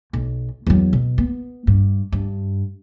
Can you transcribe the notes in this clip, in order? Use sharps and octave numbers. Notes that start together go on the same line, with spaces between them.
B1
E2 F#3
B2
B3
G2
G2